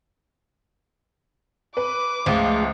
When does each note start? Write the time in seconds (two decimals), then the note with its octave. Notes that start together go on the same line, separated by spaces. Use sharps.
1.77 B4 D6
2.26 C#2 F3 A3 G#4